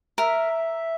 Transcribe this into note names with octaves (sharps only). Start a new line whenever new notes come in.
A#4 E5